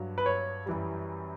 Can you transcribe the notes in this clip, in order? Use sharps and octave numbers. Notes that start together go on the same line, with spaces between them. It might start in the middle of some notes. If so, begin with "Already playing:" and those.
Already playing: G2 F#3
B4
C#5
F#2 E3 G3